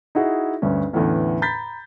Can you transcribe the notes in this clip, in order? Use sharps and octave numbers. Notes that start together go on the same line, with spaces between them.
D#4 E4 F#4 G#4
D2 G2 C#4
E2 A2 D3 B3 C#4
A#5 B5 G6 A6 B6